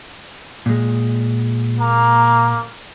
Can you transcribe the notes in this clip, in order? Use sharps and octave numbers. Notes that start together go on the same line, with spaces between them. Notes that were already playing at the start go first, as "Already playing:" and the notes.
A#2 G#3
A#3 A#5